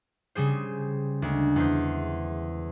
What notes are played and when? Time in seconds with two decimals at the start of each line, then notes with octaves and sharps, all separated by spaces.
0.35 C#3 G3 G#4 C5
1.22 D2 G#3
1.56 E2 C5